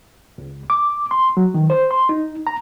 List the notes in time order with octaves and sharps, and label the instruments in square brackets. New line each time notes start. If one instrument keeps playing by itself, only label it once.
[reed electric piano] C#2
D6
C6
F#3
D#3
C5
C6
D#4
A#5